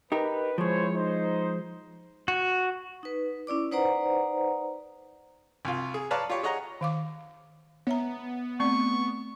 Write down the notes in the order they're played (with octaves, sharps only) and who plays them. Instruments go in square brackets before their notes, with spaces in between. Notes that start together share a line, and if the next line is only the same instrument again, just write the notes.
[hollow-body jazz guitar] D#4 G4 A#4 [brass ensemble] B4
[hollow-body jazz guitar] F3 G#3 [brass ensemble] E4 C5 C#5
[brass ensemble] D#4 C5
[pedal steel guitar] F#4
[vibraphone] D#4 B4
C#4 E4 D5 D6
D#4 B4 C5 D5 F#5 A#5
[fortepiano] C2 F4
G#4
B4 C#5 D5 F5 A5 A#5
F4 G4 C#5
G#4 C#5 D#5 F#5 A#5
[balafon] D#3 F5 D6
[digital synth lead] B3 [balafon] C#5 E5 A#5
[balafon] A3 C4 D5 [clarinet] C#6